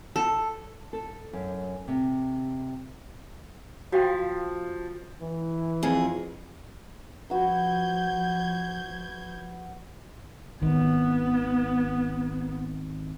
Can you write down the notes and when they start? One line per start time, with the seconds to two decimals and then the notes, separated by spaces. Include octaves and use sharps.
0.16 A4
0.93 A4
1.33 F#2
1.88 C3
3.92 F3 F#4 F5 G5
5.21 E3
5.83 F2 G#4
7.30 F3 F#4 B4 G6 G#6
10.62 G#1 D#3 B3